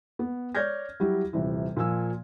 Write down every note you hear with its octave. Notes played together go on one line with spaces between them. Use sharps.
B3
C#5 D5 F6 G6 G#6 A#6
F#3 G3 E4 F#4 G4
D#1 C3 E3
A#2 F3 G#5 E6